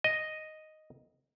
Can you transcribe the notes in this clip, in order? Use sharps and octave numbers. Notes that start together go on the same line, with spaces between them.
D#5